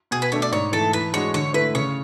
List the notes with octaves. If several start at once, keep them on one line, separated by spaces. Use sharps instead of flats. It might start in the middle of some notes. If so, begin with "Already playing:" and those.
B2 G#4
B4
A3 D4 A4 C#5
D5
G#2 C#5
E3 A3 A4
E3 B4
G#3 D4 F#4 C#5
D3 C#5
A3 E4 B4
C#3 C#5